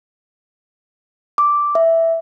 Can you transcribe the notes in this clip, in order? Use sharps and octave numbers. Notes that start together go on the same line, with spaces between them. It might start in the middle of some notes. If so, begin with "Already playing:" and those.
D6
E5